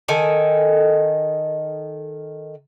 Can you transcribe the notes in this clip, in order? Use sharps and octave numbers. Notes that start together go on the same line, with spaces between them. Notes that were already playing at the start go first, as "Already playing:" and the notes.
D#3 A4 G#5